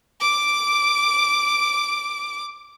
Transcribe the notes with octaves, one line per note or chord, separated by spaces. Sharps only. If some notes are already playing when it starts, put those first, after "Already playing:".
D6 D7